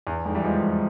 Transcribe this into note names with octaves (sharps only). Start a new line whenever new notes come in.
E2
F2 G#2
E3 G3
F3 G#3